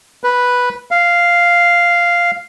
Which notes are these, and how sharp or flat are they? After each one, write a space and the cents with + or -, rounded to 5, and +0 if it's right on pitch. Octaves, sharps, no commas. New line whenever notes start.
B4 -5
F5 -5